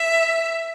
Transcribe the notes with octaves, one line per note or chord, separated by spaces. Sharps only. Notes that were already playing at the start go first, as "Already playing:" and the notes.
Already playing: E5